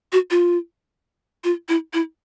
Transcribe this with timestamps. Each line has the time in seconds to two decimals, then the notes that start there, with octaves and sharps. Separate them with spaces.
0.12 F#4
0.31 F4
1.44 F4
1.69 E4
1.93 E4